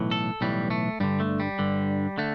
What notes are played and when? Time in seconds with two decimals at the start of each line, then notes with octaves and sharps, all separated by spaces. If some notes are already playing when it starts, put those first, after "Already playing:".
Already playing: B1 A2 E3
0.11 A4
0.41 B1 A2 E3 G3
0.70 A3
1.00 G2 D3 G3
1.20 A3
1.40 G3
1.59 G2 D3
2.18 D3 A3